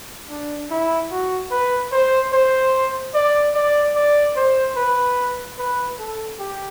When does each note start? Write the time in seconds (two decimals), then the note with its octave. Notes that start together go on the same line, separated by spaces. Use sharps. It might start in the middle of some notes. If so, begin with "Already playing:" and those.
0.29 D4
0.71 E4
1.11 F#4
1.51 B4
1.92 C5
2.33 C5
3.14 D5
3.55 D5
3.96 D5
4.37 C5
4.77 B4
5.58 B4
5.99 A4
6.40 G4